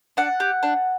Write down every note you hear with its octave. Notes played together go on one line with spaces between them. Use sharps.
D4 F#5
G4
D4